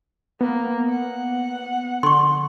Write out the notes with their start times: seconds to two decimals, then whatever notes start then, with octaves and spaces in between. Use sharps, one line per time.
0.41 A#3 B3
0.90 F#5
2.03 D3 C6 C#6